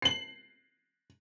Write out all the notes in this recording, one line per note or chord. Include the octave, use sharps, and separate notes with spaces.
C7 F#7